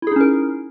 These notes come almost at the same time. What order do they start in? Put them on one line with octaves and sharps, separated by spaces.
E4 G#4 D#4 C#4 A#4